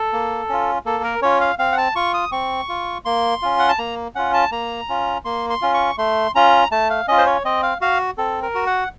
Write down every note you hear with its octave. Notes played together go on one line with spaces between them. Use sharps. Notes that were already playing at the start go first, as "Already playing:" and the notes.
Already playing: A4
A#3
C#4 F4
A#3 A4
A#4
C#4 F4 C#5
F5
C4 F5
F#5
A5
F4 C#6
D#6
C4 C#6
F4
A#3 C6
C#4 F4
F#5
A5
A#3 A#5
C#4 F4 F#5
A5
A#3 A#5
C#4 F4
A#3 C6
C6
C#4 F4
C#6
A3 C6
C#4 F4 A#5
A3 A5
F5
C#4 F4 D#5
C5
C#5
C4 D#5
F5
F#4 F5
C4 A4
A#4
F#4
F#5